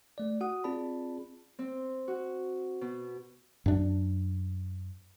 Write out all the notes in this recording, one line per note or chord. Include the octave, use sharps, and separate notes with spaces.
A3 D5
F#4 F#5 D#6
C4 F4 G#4 D5 A5 B5
C4
F#4
B2
F#2 D4